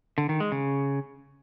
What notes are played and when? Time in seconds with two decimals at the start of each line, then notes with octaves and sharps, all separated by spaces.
0.18 D3
0.29 D#3
0.40 G#3
0.52 C#3